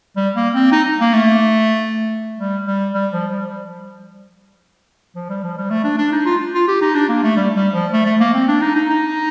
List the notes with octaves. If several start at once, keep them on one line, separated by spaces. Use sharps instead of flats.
G3
A#3
C4
D#4
A#3
A3
G3
G3
G3
F3
G3
F3
G3
F3
G3
A3
D4
D4
D#4
F4
F4
G4
D#4
D4
A#3
A3
G3
G3
F3
A3
A3
A#3
C4
D4
D#4
D#4
D#4